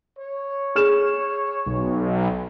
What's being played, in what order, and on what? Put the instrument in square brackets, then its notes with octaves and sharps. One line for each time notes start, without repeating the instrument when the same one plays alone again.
[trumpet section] C#5
[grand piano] G#4 F6 E7
[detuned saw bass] B1